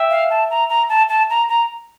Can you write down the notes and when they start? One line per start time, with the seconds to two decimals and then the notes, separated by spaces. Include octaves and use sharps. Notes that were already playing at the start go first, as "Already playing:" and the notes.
Already playing: E5 G5
0.11 F5
0.30 A5
0.51 A#5
0.69 A#5
0.89 A5
1.09 A5
1.30 A#5
1.49 A#5